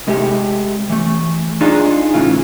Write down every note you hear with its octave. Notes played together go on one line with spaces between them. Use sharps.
C3 G#3 A3 G4
E3 A3
D4 D#4 F4 G#4 D5
A2 C#3 E3 F4